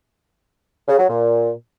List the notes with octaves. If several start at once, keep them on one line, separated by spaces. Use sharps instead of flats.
C#3
F#3
A#2